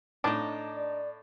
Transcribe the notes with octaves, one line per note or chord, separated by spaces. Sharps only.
A2 D4 D#4 A5 D6
D5